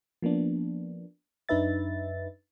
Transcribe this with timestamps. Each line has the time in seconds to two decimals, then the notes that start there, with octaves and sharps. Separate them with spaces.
0.22 F3 A#3 B3 D4
1.49 F#2 D4 D#4 B4 E5 A6